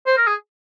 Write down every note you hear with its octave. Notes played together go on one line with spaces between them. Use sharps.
C5
A#4
G#4